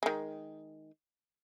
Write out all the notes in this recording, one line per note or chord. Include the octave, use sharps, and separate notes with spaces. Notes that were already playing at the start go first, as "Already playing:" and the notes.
D#3 G#3